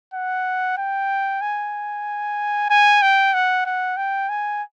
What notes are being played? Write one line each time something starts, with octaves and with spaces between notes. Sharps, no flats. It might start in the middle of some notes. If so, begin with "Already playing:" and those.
F#5
G5
G#5
G#5
G5
F#5
F#5
G5
G#5